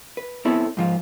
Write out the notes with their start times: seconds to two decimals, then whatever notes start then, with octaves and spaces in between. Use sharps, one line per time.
0.17 B4
0.45 B3 C4 E4 A4 C#5
0.77 G#2 F3 F4